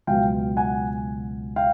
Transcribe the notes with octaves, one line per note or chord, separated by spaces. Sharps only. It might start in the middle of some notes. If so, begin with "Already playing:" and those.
C#2 B2 F#3 F5 G5
F#5 G#5
F5 G5